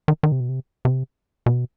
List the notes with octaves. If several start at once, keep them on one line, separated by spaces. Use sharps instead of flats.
D#3
D#3
C3
B2
C3
C3
B2